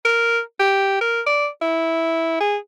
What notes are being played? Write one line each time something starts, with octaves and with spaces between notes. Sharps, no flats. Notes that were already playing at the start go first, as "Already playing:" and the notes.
A#4
G4
A#4
D5
E4
G#4